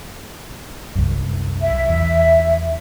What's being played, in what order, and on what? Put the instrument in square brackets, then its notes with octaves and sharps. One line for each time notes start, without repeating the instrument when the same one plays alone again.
[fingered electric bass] C2 F#2
[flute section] E5
[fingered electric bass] E2